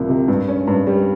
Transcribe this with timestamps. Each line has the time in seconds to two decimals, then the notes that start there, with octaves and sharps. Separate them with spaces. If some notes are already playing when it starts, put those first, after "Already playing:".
Already playing: C2 F3 A#3
0.09 C3
0.28 G2
0.48 C#4
0.68 G2
0.87 G3